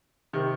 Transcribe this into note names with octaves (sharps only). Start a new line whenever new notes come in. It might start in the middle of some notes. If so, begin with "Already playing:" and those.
C3 D#3